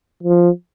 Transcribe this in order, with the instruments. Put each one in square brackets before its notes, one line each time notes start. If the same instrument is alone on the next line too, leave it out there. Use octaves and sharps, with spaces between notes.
[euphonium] F3